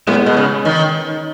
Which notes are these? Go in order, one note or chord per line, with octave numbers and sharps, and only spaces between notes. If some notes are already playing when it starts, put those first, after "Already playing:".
A2 G#3 B3
B2
C#3
D#3